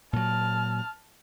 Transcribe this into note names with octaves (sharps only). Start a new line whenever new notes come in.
A#2 F#3 A5 F6